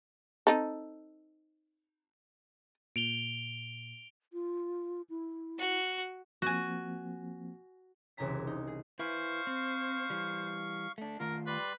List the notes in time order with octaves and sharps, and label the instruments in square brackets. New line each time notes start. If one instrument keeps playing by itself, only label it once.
[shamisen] C4 D#4 A4
[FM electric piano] A#2 [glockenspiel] D7 F7 G7
[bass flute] F4
E4
[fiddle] F#4
[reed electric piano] F3 A#3 C4 [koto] F#4 G#5
[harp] E1 C2 C#3 G#5 A#5 B6
D#4
G#4
[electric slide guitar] E4 B4 [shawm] C5 [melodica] F5 C#6
[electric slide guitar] C4
E3 G3
A3 D4
[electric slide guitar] D#3 A3 F4 [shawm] A#4
[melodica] G3 D5 C6 [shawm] B4